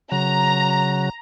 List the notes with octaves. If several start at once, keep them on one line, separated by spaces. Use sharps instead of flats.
C#3 F#3 A#5